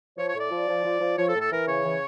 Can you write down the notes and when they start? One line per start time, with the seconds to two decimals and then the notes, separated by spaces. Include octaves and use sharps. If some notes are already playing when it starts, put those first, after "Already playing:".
0.17 F3 C#5
0.29 C#5
0.35 A2
0.40 D5
0.51 F3
0.68 F3
0.84 F3
1.01 F3
1.17 F3 C#5
1.28 A4
1.35 A2
1.41 A4
1.52 E3 A#4
1.68 C#3 C#5
1.84 E3